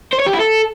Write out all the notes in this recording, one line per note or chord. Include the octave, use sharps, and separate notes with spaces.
C5
C#5
G4
E4
A4